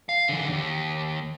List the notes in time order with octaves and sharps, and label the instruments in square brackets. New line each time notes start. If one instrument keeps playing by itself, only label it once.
[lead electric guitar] F5
D3 E3
D#2